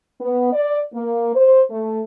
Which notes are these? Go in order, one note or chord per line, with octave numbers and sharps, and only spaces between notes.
B3
D5
A#3
C5
A3